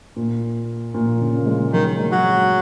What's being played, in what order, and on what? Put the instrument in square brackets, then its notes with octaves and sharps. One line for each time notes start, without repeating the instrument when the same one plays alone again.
[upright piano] A#2
A#2
C#3
A#3
G#3
[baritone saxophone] D#3 [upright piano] F#3
[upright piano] G#3
[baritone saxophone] F#3
[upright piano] G#3